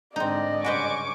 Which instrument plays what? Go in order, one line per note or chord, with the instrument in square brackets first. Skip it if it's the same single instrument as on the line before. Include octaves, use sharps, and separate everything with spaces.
[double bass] G#2 D3 [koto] C4 D#4 [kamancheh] D5 D#5
[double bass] G2 C#3 [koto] F#4 B4 C5 [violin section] G#5 C#6 D6